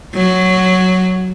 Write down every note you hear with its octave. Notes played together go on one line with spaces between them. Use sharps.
F#3